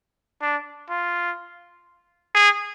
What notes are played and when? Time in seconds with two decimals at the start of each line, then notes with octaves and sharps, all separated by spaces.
0.41 D4
0.89 F4
2.35 G#4